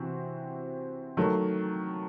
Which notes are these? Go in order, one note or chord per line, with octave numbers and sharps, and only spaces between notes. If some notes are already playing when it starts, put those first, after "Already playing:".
Already playing: C3 E3 C4 F#4
D#3 F#3 A3